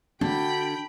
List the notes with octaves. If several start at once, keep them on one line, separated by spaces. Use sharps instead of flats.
D3 D4 F#4 G5 B5